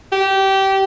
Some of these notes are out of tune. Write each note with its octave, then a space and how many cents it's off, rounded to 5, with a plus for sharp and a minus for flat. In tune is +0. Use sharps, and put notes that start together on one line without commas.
G4 -20